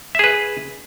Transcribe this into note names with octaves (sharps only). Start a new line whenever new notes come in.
G#4 B4 E5